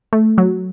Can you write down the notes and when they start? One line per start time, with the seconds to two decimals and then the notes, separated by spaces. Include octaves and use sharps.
0.13 A3
0.38 F#3